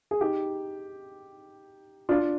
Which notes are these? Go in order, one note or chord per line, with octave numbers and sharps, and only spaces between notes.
G#4
D#4 G4
D4 F4